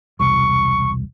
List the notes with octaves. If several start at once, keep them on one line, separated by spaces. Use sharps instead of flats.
E1 C2 C#6